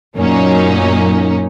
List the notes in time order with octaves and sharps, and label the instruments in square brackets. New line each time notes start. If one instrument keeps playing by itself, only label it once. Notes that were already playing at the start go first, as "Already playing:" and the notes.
[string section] F#2 A#2 A#3 C#4 D#4